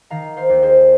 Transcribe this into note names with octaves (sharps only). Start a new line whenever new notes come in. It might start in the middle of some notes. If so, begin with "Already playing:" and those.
D#3 F5 A#5
C5 F5
D#2
G#4 C5